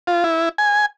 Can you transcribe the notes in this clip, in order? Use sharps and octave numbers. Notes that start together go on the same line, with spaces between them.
F4
E4
G#5